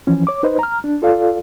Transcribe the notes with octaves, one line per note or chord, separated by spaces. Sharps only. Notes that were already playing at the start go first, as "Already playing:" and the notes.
E3 F3 C#4
C#5 D6
D#4 B4 C5 D#5
A#5 F6
D4
F4 A4 D5 F5